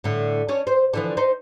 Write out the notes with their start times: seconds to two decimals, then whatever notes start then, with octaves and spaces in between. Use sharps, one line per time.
0.04 A2 D3
0.49 C#4 D4 C#5
0.67 C5
0.94 D3 E3 F3
1.17 D#4 C5